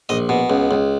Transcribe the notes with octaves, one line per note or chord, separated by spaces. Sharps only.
A#1 D#5
B2
C#2
C#2